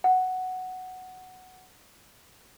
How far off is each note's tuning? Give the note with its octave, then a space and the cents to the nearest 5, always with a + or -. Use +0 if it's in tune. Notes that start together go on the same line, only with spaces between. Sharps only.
F#5 +5